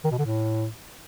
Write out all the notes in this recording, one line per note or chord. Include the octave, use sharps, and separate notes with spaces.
D#3
B2
D3
A2